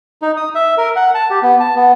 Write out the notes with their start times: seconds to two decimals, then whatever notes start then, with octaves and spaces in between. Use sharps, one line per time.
0.22 D#4
0.37 D#6
0.55 E5
0.77 A#4
0.96 F#5
1.14 A5
1.30 G4
1.43 B3
1.60 A5
1.76 B3